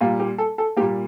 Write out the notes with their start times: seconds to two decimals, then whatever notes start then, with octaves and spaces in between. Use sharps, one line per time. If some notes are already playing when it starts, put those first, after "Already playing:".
0.01 A#2 G3 A#3 F4
0.20 G4
0.38 A4
0.58 A4
0.77 A#2 G3 A#3 G4